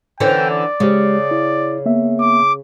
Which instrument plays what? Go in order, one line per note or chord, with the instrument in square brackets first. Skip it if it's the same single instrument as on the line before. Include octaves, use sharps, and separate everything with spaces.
[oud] D3 E3 C#4 [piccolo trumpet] G5
[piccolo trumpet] D5
[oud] C#3 [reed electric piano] G#3 G4
[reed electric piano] E4
A#3 B3 E5
[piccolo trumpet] D6